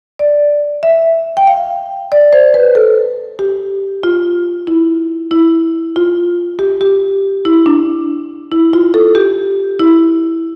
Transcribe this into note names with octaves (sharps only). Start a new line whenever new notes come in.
D5
E5
G5
F5
D5
C5
B4
A4
G4
F4
E4
E4
F4
G4
G4
E4
D4
E4
F4
A4
G4
E4